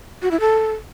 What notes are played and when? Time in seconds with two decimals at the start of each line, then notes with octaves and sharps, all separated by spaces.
0.22 F#4
0.31 E4
0.40 A4